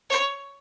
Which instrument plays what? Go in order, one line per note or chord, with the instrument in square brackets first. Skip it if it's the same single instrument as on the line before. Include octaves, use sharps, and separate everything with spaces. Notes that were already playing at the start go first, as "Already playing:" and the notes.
[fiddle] C#5